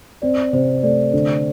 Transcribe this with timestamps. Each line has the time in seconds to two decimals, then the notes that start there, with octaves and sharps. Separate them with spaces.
0.22 C4 D5
0.53 C3 C5
0.83 A3 D5
1.13 D3